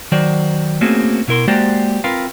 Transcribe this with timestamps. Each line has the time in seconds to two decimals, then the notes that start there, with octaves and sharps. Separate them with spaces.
0.12 D#3 F#3 F#4 C5 D5
0.81 A3 A#3 C4 C#4 F#4 G#4
1.28 B2 E4 A#4 C6
1.48 G#3 A#3 F#4 G4 C5 D5
2.04 C4 F4 A#4 B4 F5